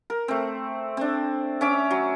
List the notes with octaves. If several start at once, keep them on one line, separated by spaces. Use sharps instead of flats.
A#4
A3 C4
C4 D4
C#4 E5 D6
F#3